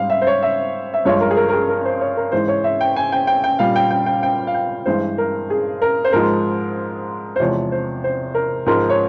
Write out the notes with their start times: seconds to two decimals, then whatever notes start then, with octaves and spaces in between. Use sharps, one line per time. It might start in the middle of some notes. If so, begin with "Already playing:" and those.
Already playing: G#2 G3 F5
0.10 E5
0.22 C5
0.27 C#5
0.43 E5
0.94 E5
1.05 G2 F3 G#3 C#5
1.21 A#4
1.31 G#4
1.37 A#4
1.49 A#4
1.53 G#4
1.69 A#4
1.85 C5
2.01 C#5
2.17 A#4
2.32 G#2 E3 G#3 C5
2.48 C#5
2.64 E5
2.81 G5
2.96 G#5
3.12 G5
3.27 G5
3.44 G5
3.59 A#2 G3 F5
3.76 G5
3.90 G5
4.06 G5
4.23 G5
4.47 F5
4.54 G5
4.86 G2 E3 G#3 C5
5.18 A#4
5.50 G#4
5.82 A#4
6.05 C5
6.13 G#2 F3 G#3 A#4
7.36 C5
7.40 E2 C3 F3 G#3 C#5
7.72 C5
8.04 C5
8.35 A#4
8.66 G#2 F3 G#3 A#4
8.90 C#5